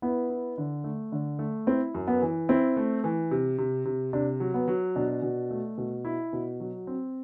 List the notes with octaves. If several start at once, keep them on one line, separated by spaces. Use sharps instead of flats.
B3 E4
E4
D3
A3
D3
A3
C4 E4
F#2
B3
E3
C4 E4
A3
E3
C3
C3
C3
C3 D4
F#3
B3
F#3
B2 D4
B2
A3
B2
E4
B2
F#3
C4